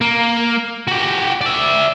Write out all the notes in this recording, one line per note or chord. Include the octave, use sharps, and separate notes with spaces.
A#3
F#4 G4
D5 E5